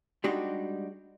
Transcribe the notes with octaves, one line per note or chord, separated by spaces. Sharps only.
G3 G#3 D4 D#4 F#4 G4